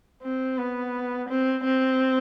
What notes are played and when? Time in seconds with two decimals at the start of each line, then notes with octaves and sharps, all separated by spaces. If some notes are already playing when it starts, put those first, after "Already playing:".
0.23 C4
0.57 B3
1.29 C4
1.64 C4